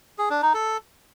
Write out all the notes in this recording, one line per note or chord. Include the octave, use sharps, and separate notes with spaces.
G#4
D4
D#4
A4